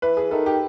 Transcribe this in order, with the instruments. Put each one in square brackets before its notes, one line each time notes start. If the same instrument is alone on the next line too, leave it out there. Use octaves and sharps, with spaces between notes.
[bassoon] E3 [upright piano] B4
[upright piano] G#4
[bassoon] D#3 [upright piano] A4
[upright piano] G4